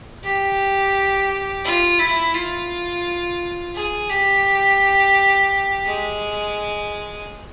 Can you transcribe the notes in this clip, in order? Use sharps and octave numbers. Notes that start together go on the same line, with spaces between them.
G4
F4
E4
F4
G#4
G4
G#3